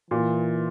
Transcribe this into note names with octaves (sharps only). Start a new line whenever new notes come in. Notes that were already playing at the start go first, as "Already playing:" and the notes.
A#2 E3